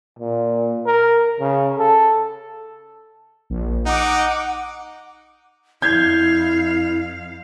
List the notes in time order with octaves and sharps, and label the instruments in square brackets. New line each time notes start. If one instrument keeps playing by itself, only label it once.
[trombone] A#2
A#4
C#3
A4
[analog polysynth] A#1
[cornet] D#4 [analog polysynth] F#5 D6
[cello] F2 F5 [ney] E4 [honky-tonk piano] G6 G#6